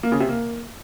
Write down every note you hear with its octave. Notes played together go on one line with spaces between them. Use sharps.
A#3
C#3
C3
A#3